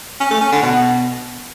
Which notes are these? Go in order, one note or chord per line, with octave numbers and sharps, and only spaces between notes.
C#4
A3
C#4
D3
B2